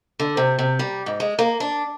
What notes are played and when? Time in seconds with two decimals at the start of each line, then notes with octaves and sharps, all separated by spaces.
0.20 D3
0.37 C3
0.59 C3
0.79 G3
1.06 G#2
1.20 G#3
1.39 A#3
1.60 D4